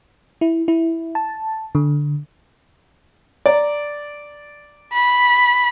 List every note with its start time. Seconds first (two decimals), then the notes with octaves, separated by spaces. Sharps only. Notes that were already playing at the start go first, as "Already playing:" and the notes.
0.41 E4
0.68 E4
1.15 A5
1.75 D3
3.46 D5 A#5
4.94 B5